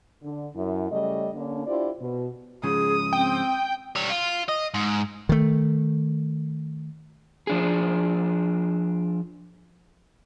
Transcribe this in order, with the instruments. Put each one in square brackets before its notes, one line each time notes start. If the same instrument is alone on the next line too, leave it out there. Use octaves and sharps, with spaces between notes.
[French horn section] D3
F#2 E4
C#3 G3 A3 C#5 D#5
D3 A#3 C#4 D4
D4 E4 F4 G4 C5 D5
B2
[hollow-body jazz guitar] G#2 C#3 F3 [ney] G#4 [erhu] D#6
[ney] C4 [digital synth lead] G5
[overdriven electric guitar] G3 C#5
F4
D#5
G#2
[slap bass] D#3 A3
[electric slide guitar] F3 D4 G#4